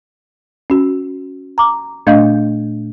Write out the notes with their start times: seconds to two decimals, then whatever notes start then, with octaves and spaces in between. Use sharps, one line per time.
0.70 C#4 F#4
1.58 A#5 D6
2.07 A#2 A3 D4 D#5 F5 G6